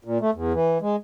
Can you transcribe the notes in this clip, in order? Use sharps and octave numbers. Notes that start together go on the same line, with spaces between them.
A#2
A3
E2
E3
G#3